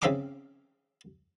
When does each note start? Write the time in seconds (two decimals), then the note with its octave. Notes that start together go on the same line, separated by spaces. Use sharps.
0.02 C#3 C4 E5 F5 A#5 D6